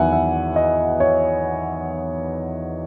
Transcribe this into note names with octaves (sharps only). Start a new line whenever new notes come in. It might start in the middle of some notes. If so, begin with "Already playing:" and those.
Already playing: E2 D#3 F#3 B3 E5 F#5 G#5
E5
D#5
C#5